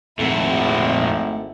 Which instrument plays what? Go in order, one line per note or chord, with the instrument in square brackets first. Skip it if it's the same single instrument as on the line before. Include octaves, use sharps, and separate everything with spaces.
[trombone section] G#1 [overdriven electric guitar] F2 A#2 [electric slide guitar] A3 A4 F#5 [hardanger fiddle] E4